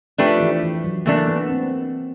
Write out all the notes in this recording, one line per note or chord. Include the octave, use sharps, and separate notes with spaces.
F3 A3 D4 G4 B4
E3
E3
F#3
E3 A3 A#3 D4
B3
C4